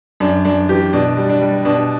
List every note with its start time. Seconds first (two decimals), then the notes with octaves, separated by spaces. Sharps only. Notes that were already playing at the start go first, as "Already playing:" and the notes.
0.20 F#2 D4
0.45 F#2 D4
0.69 E3 G4
0.93 B2 D4
1.17 G3
1.29 D4
1.41 G3
1.65 B2 D4